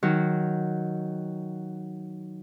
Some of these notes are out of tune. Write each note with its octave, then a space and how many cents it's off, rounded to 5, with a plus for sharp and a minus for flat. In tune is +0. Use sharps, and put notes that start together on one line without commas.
D#3 +0 F#3 +0 F#4 +0